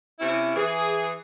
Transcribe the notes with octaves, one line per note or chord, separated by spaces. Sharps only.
C3 C#4 E4
E3 G#4